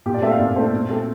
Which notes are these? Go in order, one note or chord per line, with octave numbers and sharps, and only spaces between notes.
A#2 G4
D5
A3 C4 E5
F5
A#2 D5
A3 C4 C5
A#2
A3 C4